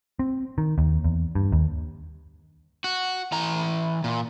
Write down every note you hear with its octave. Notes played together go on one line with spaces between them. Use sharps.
C4
D#3
D#2
E2
G2
D#2
F#4
E3 A#5
A#2